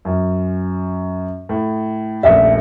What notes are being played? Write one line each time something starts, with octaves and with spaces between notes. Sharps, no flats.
F#2
A2
D#1 A#1 A3 E5